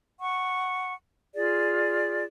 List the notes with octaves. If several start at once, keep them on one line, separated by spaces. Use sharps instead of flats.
F#5 C#6
F4 G#4 D5